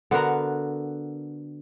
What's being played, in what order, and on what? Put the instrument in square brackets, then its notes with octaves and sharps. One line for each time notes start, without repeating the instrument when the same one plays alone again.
[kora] D3 B3 F#4 A#4